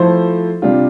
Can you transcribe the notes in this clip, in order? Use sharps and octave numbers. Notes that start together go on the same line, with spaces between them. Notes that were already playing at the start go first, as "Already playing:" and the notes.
Already playing: F3 A3 E4 A4 C5
C3 G3 D4 F4